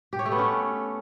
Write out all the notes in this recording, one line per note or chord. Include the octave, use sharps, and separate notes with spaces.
G4
C#5
A3
B3
C#4